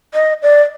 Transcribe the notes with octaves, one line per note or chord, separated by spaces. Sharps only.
D#5
D5